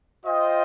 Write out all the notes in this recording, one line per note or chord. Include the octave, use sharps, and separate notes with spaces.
F4 C5 D#5 G5